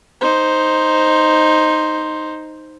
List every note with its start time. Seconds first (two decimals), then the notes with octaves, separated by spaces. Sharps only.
0.21 D#4 C5